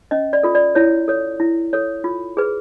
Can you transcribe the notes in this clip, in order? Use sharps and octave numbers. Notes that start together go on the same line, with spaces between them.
C#4 D#5
D5
F4 A4
D5
E4 C#5
A4 C#5
E4
A4 C#5
F4
G#4 B4